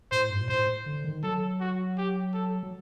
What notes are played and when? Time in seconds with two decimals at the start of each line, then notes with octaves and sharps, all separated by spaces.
0.11 A2 C5
0.30 G2
0.41 A#2
0.49 A2 C5
0.86 D3
1.04 D#3
1.23 F#3 A4
1.60 F#4
1.97 G4
2.34 A4
2.63 F#3